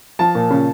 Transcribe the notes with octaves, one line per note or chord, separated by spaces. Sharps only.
F3 A5
A#2
C#3